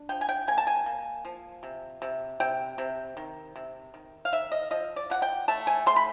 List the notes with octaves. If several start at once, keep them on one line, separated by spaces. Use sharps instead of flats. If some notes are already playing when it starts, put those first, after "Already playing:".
Already playing: D4
F3 G5
G#5
G5
A#3 G#5
A5
G#5
A#3
F3
C3
C3
C3 G5
C3
D#3
C3
D#3
F5
D#3 E5
D#5
F3 D#5
D5
F3 F#5
G5
A3 A5
G#5
A3 C6
B5